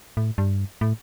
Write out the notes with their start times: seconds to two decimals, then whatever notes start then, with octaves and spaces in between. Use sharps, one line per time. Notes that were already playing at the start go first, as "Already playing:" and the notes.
0.17 A2
0.38 G2
0.81 A2